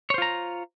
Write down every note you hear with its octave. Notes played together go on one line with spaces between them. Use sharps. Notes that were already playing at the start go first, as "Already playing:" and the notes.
F4 C5 C#5 A#5